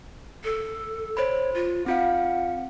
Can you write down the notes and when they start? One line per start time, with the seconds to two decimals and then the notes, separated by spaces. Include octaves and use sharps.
0.44 A4
1.17 C5 C#5 B5
1.55 F4
1.86 C4 F4 F5 F#5